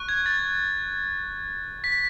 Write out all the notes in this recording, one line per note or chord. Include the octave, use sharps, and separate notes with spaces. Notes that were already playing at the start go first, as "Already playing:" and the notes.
Already playing: C#6 F#6
G#6
A6
B6